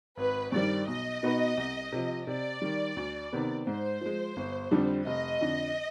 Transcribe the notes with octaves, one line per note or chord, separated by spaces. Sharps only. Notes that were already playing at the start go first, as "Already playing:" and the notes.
G#1 B4
G2 D#3 G3 C4 D5
B1 D#5
B2 B3 D#4 B4
C2
C3 F3
C3 D5
D#3 G3
D2
C3 D#3 B3
G#2 C5
F3 G#3
G1
F2 D3 G3 D4
F1 D#5
F2 D3